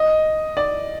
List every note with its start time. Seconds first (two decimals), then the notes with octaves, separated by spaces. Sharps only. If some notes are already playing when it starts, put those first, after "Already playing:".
Already playing: D#5
0.57 D5